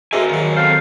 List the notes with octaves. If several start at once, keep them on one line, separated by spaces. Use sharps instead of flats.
G#3 A3 C4 F#4 G#4 A#4 D#5 G#5
D#2 F#3
C4 A4 C5 F5